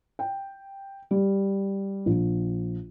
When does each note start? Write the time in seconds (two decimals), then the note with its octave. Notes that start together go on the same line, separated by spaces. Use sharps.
0.19 G5
1.11 G3
2.06 A#1